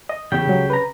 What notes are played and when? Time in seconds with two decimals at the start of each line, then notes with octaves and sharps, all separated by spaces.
0.09 D#5
0.32 E2 C#3 G4 G5
0.47 C#2 F#3
0.70 B4 A#5